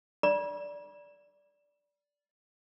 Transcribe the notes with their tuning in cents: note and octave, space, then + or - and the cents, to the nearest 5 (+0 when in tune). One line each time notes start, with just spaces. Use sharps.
D5 -10 B5 -45